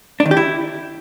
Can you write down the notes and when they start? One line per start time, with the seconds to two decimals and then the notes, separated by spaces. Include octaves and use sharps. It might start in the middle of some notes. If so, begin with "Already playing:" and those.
0.20 D4
0.26 D#3
0.31 G4
0.37 E4